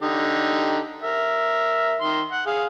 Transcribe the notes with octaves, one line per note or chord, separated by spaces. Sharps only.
D3 D#4 G4
A#4 E5
D#3 C6
F#5
G#4 F5